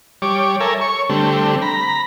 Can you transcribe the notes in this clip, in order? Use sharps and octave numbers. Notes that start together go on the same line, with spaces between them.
G3 C#5 D6
A4 A#4 C#5 E5 G#5
C#5 C#6
D3 G3 A3 C4
A#5 B5